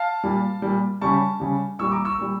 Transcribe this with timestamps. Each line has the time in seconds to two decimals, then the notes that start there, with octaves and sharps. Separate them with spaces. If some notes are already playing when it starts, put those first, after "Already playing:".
Already playing: F5 A5
0.24 A#2 G3
0.62 A#2 G3
1.01 C#3 G3 A5 C#6
1.40 C#3 G3
1.79 A#2 G3 C#6 E6
1.92 A#5 D6
2.05 C#6 E6
2.18 A#2 G3